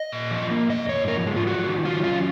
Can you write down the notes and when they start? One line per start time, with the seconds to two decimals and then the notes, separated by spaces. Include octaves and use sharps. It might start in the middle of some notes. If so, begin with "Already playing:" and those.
Already playing: D#5
0.12 A#2
0.31 F3
0.50 A#3
0.69 G#2 D#5
0.89 G#2 C#5
1.07 F3 A#4
1.27 G#3
1.36 F4
1.47 F4 F#4
1.66 D#3
1.85 F#3 F4
2.04 C#4 F4